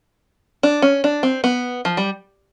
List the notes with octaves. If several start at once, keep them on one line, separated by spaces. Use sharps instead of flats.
D4
C#4
D4
C4
B3
F3
G3